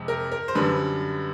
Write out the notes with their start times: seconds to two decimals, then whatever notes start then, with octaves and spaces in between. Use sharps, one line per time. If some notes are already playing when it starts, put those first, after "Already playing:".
Already playing: F2 C3 F3 G#3
0.08 A#4
0.32 A#4
0.48 C5
0.55 F#2 D3 G3 B4